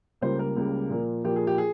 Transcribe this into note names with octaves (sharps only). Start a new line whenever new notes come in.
C#2 C#3 G3 A#3 C5
A#4
C#2 C#3 G3 A#3
A#2 F3 A#3
A#2 F3 A#3 G4
G#4
G4
G#4